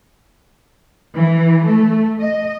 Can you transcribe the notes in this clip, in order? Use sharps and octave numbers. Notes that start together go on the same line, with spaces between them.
E3
A3
D#5